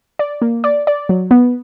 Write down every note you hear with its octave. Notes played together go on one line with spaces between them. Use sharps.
D5
A#3
D5
D5
F#3
B3